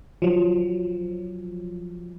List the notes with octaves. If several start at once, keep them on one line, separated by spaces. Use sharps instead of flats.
F3 F#3